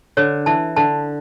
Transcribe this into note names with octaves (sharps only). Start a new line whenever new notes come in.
D3 C#5
E3 A5
D3 A5